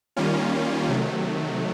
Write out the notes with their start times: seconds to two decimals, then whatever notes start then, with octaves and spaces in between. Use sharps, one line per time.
0.16 D#3 G3 A#3 C#4 F4
0.89 C3 D#3 F#3 A3